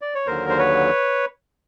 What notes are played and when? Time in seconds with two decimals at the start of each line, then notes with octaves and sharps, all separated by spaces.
0.01 D5
0.15 C#5
0.26 D#2 D3 F#3 A#4 C5
0.49 C5
0.59 B4 C#5